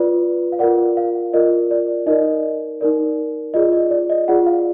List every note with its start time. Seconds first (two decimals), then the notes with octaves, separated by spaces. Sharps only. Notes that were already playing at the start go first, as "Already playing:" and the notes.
Already playing: F4 B4 D5
0.52 F5
0.59 F4 A#4 D5 F#5
0.97 F5
1.33 F4 A#4 D5 D#5
1.71 D5
2.06 D#4 A#4 D5 D#5
2.81 D#4 A#4 D5
3.54 F4 G#4 D5 D#5
3.72 D#5
3.91 D5
4.10 D#5
4.28 F4 G#4 D5 F#5
4.47 F5